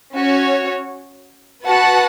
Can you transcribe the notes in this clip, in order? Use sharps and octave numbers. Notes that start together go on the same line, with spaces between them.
C#4 F#4 C#5
F#4 B4 F#5 A5